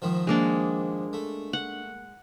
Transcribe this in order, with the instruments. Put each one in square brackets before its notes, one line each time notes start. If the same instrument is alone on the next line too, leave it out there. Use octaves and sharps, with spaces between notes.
[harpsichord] G#2 D#3 F3
[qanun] G#3 A#3 D4
[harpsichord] A3
[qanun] F#5